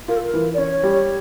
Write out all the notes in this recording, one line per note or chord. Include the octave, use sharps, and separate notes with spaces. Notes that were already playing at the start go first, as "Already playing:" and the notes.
F4 A#4
A4
A#4
E3
D5
C#4 C#5
G3